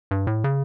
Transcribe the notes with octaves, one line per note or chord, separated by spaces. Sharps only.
G2
A2
C#3